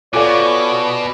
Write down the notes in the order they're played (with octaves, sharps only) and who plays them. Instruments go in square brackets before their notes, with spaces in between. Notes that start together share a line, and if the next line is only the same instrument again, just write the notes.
[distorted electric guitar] B2 [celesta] F4 A4 F5 [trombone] C#5 [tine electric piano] D5 G#5 D6